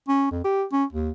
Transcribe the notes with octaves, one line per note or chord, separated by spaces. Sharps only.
C#4
F2
G4
C#4
D#2